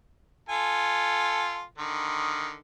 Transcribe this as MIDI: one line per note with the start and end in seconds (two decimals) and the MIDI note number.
0.49 1.62 65
0.49 1.62 69
0.49 1.62 80
1.78 2.56 50
1.78 2.56 51